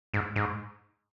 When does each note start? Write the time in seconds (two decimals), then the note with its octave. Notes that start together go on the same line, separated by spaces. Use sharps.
0.14 G#2
0.36 G#2